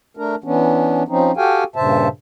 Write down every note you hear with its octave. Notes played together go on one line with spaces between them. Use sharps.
A3 D4 A#4
E3 B3 C#4 D4
F3 C4 C#4 D#4
F#4 G4 A4 F5 G5 G#5
G2 A#2 C#3 C5 E5 A5